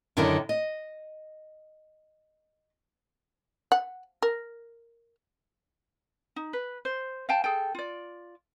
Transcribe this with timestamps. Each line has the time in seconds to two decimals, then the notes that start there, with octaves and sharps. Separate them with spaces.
0.17 F#2 D3 D#3 E4 A#4
0.49 D#5
3.72 F#5
4.22 A#4
6.36 D#4
6.53 B4
6.85 C5
7.29 F5 G5 A5
7.44 G#4 A4 G5
7.75 F4 D5